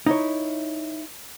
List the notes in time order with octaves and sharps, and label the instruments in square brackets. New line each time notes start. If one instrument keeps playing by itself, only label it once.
[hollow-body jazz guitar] D#4 E4 C#5